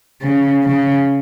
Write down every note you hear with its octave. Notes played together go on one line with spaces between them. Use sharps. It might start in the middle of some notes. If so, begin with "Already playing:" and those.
C#3
C#3